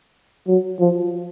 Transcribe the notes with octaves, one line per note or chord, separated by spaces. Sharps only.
F#3
F3